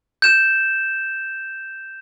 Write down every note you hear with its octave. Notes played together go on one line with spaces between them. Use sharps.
G6 E7